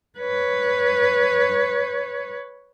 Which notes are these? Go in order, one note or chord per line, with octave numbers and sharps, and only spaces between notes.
B4 C#5